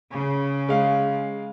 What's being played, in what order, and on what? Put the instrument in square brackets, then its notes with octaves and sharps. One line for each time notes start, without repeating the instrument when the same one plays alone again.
[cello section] C#3
[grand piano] G#3 F5